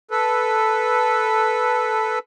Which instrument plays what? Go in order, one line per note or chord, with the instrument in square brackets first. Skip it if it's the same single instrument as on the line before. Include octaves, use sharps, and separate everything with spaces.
[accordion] A4 B4